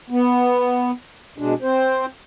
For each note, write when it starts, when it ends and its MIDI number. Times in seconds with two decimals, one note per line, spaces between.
0.10 0.91 59
1.38 1.54 47
1.38 1.54 56
1.38 1.54 62
1.62 2.06 60
1.62 2.06 72